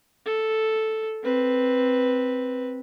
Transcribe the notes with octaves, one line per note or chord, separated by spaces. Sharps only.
A4
C4 B4